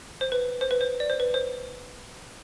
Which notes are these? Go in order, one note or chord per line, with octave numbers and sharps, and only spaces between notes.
C5
B4
C5
B4
C5
D5
C5
B4
C5